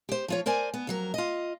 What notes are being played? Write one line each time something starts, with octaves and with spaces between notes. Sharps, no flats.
G4 C5
F3 F4 C#5
A#4 C5 D5 G#5
B3
F2 F#3 A#4
F4 D#5